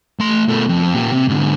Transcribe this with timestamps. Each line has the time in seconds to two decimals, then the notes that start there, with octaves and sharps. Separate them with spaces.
0.19 A3 C6
0.49 B2 A3
0.69 F2
0.94 A#2 G4
1.13 C3
1.28 G#2 D3